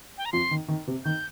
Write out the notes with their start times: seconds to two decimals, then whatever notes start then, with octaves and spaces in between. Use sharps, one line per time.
0.18 G5
0.25 A#5
0.32 F2 F3 C6
0.51 D#3
0.68 D#3
0.87 C3
1.05 D#3 G6